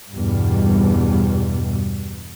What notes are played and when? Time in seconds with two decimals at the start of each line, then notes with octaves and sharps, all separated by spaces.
0.13 E2 G2 B2 G3